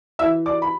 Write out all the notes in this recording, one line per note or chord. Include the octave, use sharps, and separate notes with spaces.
E3 E5 E6
D5 D6
B5